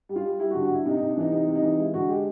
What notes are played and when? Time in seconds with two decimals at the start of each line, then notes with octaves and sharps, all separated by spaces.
0.09 G3
0.16 F4
0.25 G3
0.39 G3 E4
0.51 F#4
0.55 D3
0.62 F#4
0.70 D3 E4
0.86 C3 D#4
0.97 C3 D#4
1.10 D4
1.17 E3 D#4
1.32 C3 D#4
1.47 C3
1.55 D#4
1.62 E3
1.78 G#3 E4
1.94 D3 F#4
2.09 G#3 G4